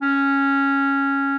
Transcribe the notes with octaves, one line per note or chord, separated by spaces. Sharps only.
C#4